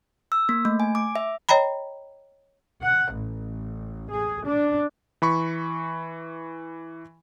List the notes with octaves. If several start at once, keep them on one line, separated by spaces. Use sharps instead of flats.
E6
A#3
A3
G#5
D6
E5
C#5 D#5 G5 A#5 B5
F#5
A1
G#4
D4
E3 B5 C#6